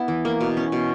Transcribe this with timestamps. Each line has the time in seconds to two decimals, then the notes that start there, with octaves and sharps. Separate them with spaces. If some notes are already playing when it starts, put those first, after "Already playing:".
Already playing: B3 E4
0.08 E3
0.25 A#3
0.41 B2
0.57 C#4
0.72 B2